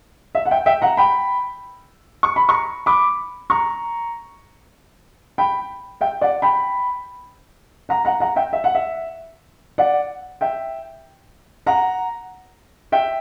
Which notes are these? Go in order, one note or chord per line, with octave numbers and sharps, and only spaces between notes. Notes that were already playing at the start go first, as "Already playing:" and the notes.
E5
F#5
E5 G5
E5 G5
F#5 A#5
G5 B5
C#6
B5
A#5 C#6
B5 D6
A#5 C#6
G5 B5
E5 G5
D5 F#5
G5 B5
F#5 A#5
F#5 A#5
F#5 A#5
E5 G5
E5
F#5
E5
D5 F#5
E5 G5
F#5 A#5
E5 G5